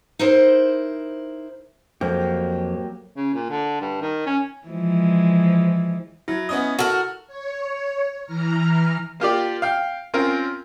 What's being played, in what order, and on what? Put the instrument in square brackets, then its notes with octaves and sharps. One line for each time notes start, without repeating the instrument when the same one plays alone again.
[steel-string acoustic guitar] D#4 E4 A#4 C5
[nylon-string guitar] F2 [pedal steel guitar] F#3 A#3 G4
[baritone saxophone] C#3
A#2
D3
G2
D#3
C#4
[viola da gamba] E3 F3 G#3
[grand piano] F#3 [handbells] E4
[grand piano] B3 C#4 D#5
[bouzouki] F#4 A#4 [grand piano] A4
[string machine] C#5
E3 A#5 F6
[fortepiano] A#3 F4 G4 D5
F5 G5
C4 C#4 F4 A#4